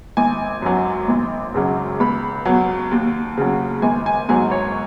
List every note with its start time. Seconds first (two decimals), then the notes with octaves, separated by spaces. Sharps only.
0.17 G#1 G#5
0.62 F#2 F#3
1.08 G#1
1.54 F#2 C#3 F#3
2.00 C#2 B5
2.45 B2 F#3
2.91 D#2
3.37 C#3 F#3
3.82 G#1 G#5
4.06 G#5
4.29 G#2 F#3 G#5
4.51 C#5